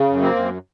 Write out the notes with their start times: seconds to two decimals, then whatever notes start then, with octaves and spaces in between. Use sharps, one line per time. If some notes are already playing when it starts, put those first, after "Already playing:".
Already playing: C#3
0.09 F#2
0.22 A#3 C4
0.35 F#2